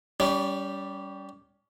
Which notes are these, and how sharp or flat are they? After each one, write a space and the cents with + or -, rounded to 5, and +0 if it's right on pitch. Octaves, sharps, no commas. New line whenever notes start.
G3 -5 C#4 +25